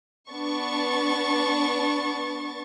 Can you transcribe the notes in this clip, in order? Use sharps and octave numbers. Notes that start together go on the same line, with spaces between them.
B3 D4 C#6 A6